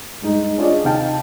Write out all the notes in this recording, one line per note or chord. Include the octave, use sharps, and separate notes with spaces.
G2 G#3 D#4
C#4 D4 F4 G#4 D5 D#5
D#2 C3 D#4 F5 G5 A5